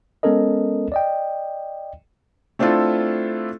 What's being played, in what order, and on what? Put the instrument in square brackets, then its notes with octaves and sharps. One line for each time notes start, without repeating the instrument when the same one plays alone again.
[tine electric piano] G#3 B3 C#4 A4 A#4 D#5
D5 D#5 G5
[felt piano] A3 C4 D4 E4 F4 A4